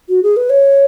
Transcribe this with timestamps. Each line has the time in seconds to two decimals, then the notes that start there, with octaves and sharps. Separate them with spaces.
0.09 F#4
0.23 G#4
0.37 B4
0.50 C#5